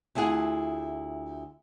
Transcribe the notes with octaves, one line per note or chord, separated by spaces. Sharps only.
D2 E4 F4 G#4 F#5